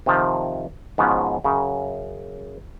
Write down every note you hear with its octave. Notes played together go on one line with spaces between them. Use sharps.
C3 D#3 F3
G#2 B2 F3 B3 C#4
F#2 C#3